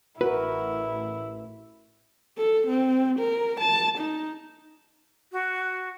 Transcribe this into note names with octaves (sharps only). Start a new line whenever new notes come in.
A1 E4 F#4 A#4 B4
A4
C4
A#4
A5
D#4
F#4